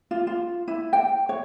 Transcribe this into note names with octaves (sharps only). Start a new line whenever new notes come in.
F4
F4
E4
G5
C#5